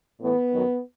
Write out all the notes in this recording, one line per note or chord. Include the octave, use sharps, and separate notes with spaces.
A2 E3 B3
F#2 D#3 F#3